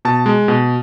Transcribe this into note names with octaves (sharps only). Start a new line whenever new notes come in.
B2 A5
G#3
B2